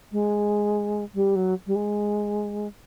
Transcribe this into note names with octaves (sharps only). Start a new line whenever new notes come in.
G#3
G3
F#3
G3
G#3